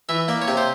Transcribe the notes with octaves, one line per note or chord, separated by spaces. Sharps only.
E3 E5
A#3 D5
C#5
C3 D5
C5